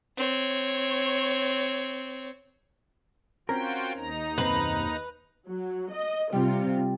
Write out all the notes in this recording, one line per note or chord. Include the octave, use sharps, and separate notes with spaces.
C4 C#5
C4 C#4 F4 F#4 A#4 G5
D#2 D#4 A#5
B1 F#2 C4 B4
F#3
D#5
C3 G3 F4 G4